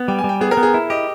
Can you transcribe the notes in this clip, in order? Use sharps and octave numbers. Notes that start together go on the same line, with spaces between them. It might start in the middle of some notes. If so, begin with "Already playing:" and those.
Already playing: B3
G3 G5
G#5
G3
G5
B3 G#4
A#4
B3
G#4
E4
G4 D#5